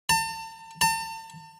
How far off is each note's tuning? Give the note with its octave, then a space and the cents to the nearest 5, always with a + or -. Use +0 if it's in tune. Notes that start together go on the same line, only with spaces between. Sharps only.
A5 +40
A5 +40